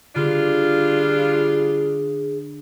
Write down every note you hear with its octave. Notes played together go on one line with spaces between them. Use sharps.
D3 G3 D4 F4 G#4